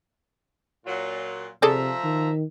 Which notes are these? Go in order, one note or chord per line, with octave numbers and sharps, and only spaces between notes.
A#2 F#3 F4
C3 F3 G#4 A4 D5 E5 A#5
D#3